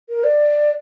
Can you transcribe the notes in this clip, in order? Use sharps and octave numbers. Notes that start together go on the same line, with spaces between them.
A#4
D5